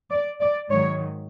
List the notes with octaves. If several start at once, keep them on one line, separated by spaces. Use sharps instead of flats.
D5
D5
G#2 D#3 F#3 C#5